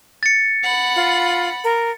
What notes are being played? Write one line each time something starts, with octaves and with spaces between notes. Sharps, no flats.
A6 C#7
F#5 B5
F4
A#4